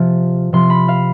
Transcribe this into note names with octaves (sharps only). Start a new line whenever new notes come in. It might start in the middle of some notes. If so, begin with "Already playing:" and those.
Already playing: C3 F3
C3 F3 C6
B5
F5